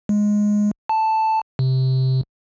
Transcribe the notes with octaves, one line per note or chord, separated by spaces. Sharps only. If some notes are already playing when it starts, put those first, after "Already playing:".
G#3
A5
C3